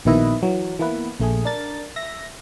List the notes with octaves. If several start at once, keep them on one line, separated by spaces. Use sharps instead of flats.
A#1 B2 D#3 E4 B4 D#5
E3 F#3
E3 A#3 B3 E4 B4
A#1 A3 G#4
D4 A#4 A6
E5 A#6